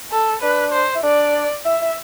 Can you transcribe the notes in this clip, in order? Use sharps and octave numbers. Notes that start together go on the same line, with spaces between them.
A4
D4 B4
C5
E4
D4 D5
E4 E5
E4